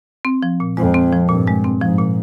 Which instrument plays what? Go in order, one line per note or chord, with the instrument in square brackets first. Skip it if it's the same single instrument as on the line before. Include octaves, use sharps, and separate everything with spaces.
[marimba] C4
F3
A#2
[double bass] F2 [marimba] G#3
[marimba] C4
F3
[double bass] G2 [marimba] A#2
[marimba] G#3
C4
[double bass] G#2 [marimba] F3
[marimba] A#2